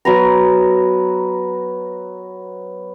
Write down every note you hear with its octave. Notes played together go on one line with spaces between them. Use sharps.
F#3 B3 A#5